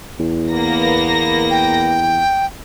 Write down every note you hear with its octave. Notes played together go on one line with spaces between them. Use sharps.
E2
A#3 B3 A#6
G5